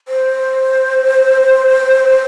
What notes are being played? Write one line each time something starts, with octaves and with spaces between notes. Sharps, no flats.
C5